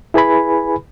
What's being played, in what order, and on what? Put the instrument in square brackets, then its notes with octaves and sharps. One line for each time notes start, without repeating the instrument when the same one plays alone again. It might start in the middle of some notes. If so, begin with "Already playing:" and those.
[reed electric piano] E4 G#4 B4 G#5 B5